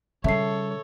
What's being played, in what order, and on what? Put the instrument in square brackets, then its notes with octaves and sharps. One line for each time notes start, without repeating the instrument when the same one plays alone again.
[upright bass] C#3 G3 [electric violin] A4 C#5 [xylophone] E5 A5 C7